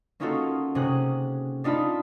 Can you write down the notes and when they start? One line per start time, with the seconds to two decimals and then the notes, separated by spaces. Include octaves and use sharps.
0.20 A#3 C#4 D#4 F4 F#4 A4
0.75 C3 C#4 G#4 F#6
1.64 D4 D#4 F4 A5 B5